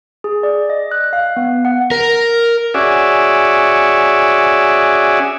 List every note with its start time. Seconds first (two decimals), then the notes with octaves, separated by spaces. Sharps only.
0.24 G#4
0.43 D5
0.70 D#5
0.91 F#6
1.13 F5
1.36 B3
1.65 F#5
1.91 A#4
2.74 C#4 F#4 G#4 D5 E5